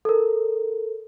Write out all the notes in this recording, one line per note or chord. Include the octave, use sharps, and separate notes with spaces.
A4 A#4